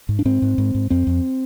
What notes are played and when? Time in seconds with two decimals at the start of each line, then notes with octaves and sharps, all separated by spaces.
0.09 G#2
0.19 D4
0.25 G#2 C4
0.42 G#2
0.58 G#2
0.75 G#2
0.90 F2 C4
1.07 F2